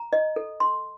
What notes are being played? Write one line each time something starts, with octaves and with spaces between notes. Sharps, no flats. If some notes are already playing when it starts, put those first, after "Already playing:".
Already playing: A#5
D#5
A4
C6